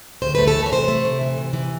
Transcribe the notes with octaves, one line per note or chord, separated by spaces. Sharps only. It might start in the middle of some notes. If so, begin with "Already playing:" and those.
D2 C5
A3 B4
A4
E3 A#4
C#5
C3 C5
A3
C3
E3
C3
E3